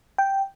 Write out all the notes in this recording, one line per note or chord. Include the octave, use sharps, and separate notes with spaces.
G5